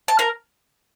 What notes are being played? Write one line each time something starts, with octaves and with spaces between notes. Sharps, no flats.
A5
A#4 A#5